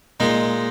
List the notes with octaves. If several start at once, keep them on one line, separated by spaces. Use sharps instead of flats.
A#2 G#3 D#4